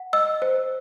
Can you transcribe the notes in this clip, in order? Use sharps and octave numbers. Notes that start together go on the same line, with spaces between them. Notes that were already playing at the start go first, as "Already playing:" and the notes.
Already playing: F#5
D#5 E6
C5